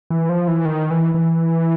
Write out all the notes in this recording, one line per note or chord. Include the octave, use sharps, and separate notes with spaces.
E3
F3
E3
D#3
E3
E3